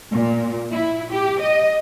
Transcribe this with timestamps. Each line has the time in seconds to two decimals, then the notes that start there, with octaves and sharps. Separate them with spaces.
0.12 A#2
0.71 E4
1.11 G4
1.40 D#5